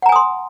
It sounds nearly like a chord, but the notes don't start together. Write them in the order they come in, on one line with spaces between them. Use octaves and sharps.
F#5 A#5 G#5 D#6 C6